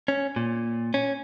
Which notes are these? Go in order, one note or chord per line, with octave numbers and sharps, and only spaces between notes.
C#4
A#2
C#4